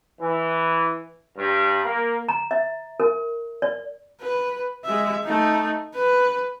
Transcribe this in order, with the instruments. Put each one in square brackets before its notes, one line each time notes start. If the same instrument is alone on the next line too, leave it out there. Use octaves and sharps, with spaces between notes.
[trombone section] E3
G2
A#3
[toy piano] A#5
E5
A#4
D5
[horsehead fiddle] B4
G#3 E5
A3 D#4
B4